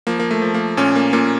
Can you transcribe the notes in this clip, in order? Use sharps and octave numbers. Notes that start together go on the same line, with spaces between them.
F3 A#3
A#3
A3
F3
A#3
A#2 C#4
A#3
A#2 A#3